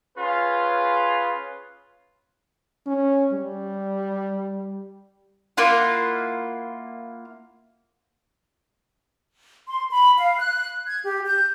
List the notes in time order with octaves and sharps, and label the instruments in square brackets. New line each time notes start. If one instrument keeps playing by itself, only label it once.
[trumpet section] C#4 F4 G#4 B4
[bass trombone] C#4
G3
[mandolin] A#3 E4 F4 F#5
[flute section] C6
B5
F5
F#6
G#6
G4
G6